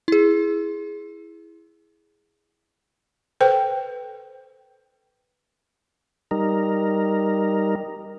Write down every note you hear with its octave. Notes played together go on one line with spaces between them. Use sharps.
E4 G#4
A4 B4 C5 G5
G3 D#4 A#4